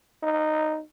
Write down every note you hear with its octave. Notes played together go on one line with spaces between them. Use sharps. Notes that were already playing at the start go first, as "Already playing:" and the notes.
D#4